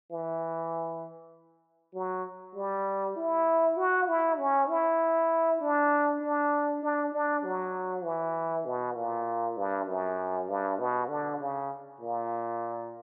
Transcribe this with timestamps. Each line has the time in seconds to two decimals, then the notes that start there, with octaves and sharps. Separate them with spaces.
0.12 E3
1.94 F#3
2.55 G3
3.16 E4
3.77 F#4
4.08 E4
4.38 C#4
4.69 E4
5.61 D4
6.21 D4
6.83 D4
7.12 D4
7.44 F#3
8.04 E3
8.66 B2
8.95 A#2
9.57 G2
9.87 F#2
10.48 G2
10.79 B2
11.09 D3
11.40 C#3
12.00 A#2